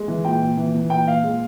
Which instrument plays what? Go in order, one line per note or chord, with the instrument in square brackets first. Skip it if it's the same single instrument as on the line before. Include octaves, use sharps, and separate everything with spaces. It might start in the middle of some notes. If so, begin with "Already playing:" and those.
Already playing: [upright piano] G#3
E3
A#2 G5
A#2
E3
E3
A#2 G5
A#2 F5
G#3